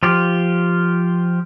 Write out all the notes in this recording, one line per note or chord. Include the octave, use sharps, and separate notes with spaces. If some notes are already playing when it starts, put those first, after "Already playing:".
F3 F4 G4